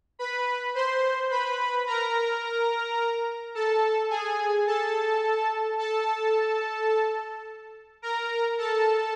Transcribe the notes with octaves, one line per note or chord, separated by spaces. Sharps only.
B4 B5
C5 C6
B4 B5
A#4 A#5
A4 A5
G#4 G#5
A4 A5
A4 A5
A#4 A#5
A4 A5